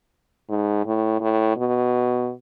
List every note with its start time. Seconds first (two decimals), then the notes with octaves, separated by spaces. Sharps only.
0.49 G#2
0.86 A2
1.21 A2
1.57 B2